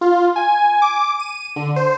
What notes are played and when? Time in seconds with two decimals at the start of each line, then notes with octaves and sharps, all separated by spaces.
0.01 F4
0.36 G#5
0.82 D6
1.19 D#7
1.56 D3
1.76 C5